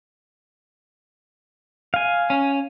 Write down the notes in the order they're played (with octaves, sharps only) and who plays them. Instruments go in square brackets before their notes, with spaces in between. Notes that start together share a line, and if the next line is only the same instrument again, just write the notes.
[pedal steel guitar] F5 G#5
[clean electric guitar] C#4